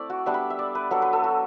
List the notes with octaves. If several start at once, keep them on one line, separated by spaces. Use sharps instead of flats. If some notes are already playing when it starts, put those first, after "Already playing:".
Already playing: A3 C4 E4 D5
F#4
G3 B3 D4 E5
B5
E5
D5
B4
F#3 B3 D4 A4
B4
A4
F#4